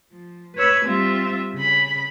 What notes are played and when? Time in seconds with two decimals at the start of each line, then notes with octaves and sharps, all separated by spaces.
0.12 F3
0.56 B4 C#5 B5 E6 G#6
0.85 G3 C4 F4 E5
1.54 C#3 B5